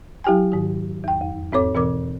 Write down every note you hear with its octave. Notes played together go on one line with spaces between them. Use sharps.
F#3 E4 G4 G5 G#5
G#2 D#3
E2 G5
F2
E2 G#2 C4 A4 C#5 D6
B2 E3 C4 A#4 D6